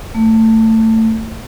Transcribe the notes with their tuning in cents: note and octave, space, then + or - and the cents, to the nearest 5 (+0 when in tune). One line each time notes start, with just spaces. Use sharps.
A3 +20